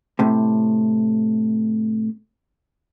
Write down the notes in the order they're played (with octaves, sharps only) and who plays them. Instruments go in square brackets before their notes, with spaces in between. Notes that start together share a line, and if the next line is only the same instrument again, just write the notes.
[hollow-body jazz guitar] A2 C3